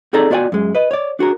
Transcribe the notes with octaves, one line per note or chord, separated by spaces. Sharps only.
C4 D#4 G#4 A4 D5 A#5
B3 F4 F#4 D5 G5 G#5
F#2 G#3
B4 D#5
C#5 D5
D4 F#4 G#4 A#4